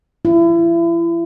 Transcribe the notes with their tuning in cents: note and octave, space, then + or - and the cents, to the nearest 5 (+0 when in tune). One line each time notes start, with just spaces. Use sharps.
E4 +35